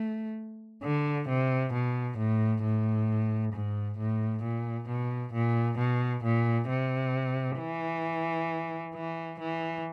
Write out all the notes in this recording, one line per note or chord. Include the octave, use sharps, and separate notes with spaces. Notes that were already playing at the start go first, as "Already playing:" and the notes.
Already playing: A3
D3
C3
B2
A2
A2
G#2
A2
A#2
B2
A#2
B2
A#2
C3
E3
E3
E3